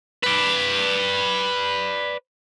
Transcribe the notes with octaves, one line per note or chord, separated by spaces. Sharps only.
B4 D5